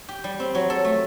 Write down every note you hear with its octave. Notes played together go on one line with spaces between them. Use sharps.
G4
G3
C4
F#3
A4
A3